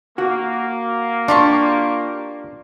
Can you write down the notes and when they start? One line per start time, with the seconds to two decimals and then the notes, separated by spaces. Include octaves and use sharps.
0.18 A#3 F#4
1.28 D4 F4 G4 C#6